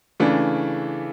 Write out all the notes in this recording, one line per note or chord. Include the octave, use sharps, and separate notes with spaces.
C#3 E3 A3 D4